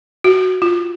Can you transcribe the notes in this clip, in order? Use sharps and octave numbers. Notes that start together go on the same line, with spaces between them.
F#4
F4